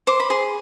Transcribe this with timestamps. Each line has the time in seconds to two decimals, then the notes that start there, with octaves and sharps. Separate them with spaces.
0.07 C5 D6
0.20 B5
0.30 G#4 C6